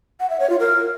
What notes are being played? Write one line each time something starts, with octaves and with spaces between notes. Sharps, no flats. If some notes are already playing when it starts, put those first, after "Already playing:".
F#5
E5
C#5
F4
A#4